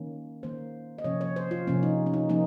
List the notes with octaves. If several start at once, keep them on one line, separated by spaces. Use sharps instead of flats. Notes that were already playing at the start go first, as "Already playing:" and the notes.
Already playing: D#3 A#3 C#4
D#3 A#3 C#4 C5
D#5
C3 F3 A#3 C#4 C#5
C#5
C5
F4
C3 F3 A#3 C#4
D#4
C#4
D#4
F3 A#3 C#4 D#4